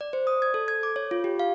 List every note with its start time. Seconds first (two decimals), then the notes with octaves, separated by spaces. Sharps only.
0.01 D5
0.13 C5
0.27 D#6
0.42 G#6
0.54 A4
0.68 G#6
0.83 D6
0.96 C#5
1.11 F4
1.24 G4
1.39 F5